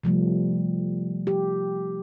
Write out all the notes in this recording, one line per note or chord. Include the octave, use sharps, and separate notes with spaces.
C3 F3 G3 A3
G4